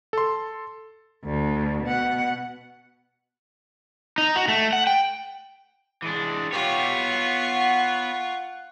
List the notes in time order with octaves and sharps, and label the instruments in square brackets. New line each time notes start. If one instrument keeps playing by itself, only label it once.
[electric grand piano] A4 C6
[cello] D2
B2 F#5
[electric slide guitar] D#4
F#4
A3
F#5
G5
[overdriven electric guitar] E3 D4 [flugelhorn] G#3
[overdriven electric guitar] B3 C#5 [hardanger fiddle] F4 C#6 [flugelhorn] G4
[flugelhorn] F#5